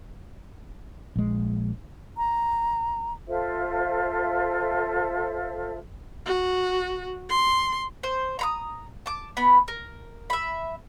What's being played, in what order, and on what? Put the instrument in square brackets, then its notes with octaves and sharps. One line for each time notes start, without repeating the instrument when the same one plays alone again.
[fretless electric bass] A#1 G#3
[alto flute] A#5
[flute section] F4 A4 C5 E5
[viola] F#4
C6
[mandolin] C5
A#5 B5 D#6
A5 D6
B3 B5
A#4
E5 B5